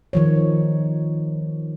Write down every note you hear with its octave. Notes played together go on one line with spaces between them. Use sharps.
D#3 F3 C#5